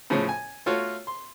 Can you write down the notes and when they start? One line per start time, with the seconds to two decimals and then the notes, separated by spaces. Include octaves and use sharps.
0.10 A2 C#3 F3 C#4
0.29 G#5
0.66 A3 F4 F#4 C#5
1.07 C6